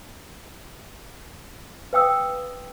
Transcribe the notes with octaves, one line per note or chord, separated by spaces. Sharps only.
B4 F5 G5 D#6 E6